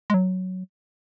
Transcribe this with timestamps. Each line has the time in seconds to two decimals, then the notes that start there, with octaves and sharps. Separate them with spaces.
0.10 G#3
0.14 F#3